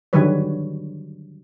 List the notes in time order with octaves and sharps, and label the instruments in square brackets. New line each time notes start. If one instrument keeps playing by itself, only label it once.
[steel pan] D3 D#3 F#3 G3 B4 C#5